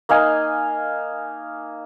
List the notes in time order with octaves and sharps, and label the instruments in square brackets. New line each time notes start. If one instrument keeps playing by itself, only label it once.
[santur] A#3 D#4 F5 G#5